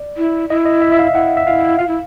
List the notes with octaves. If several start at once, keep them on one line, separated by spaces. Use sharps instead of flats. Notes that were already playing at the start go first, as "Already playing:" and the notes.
Already playing: D5
E4
E4 D#5
D#5
E5
E5
F5
E4 F#5
E5
E4 F4 F5
F4 F5
E4